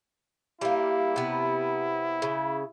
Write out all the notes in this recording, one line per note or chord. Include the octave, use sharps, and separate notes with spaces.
G3 A#3 E4
C3 B3
C#3